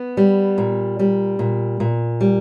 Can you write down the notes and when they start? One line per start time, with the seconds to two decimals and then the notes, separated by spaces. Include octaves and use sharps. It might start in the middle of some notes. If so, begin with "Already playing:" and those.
Already playing: B3
0.17 G3
0.58 A#2
0.99 G3
1.39 A#2
1.80 A#2
2.21 G3